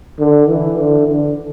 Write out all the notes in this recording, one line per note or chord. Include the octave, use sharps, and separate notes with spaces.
D3
E3
D3
D3